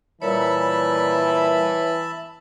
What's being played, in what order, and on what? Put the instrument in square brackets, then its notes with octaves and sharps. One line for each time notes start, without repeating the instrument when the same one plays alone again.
[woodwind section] A#2 G3 [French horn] E3 [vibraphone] C#5 [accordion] E5 A5 B5